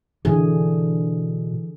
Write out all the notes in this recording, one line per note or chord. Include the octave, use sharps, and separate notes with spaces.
B2 D3 E3 G#4